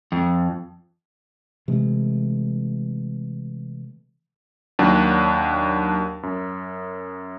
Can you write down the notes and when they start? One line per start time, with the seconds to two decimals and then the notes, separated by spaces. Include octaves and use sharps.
0.12 F2
1.68 C3 E3 G#3 A3
4.79 D#2 F#3 D4
6.23 F#2